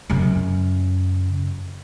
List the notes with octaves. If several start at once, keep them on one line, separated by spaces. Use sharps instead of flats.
F#2 C#3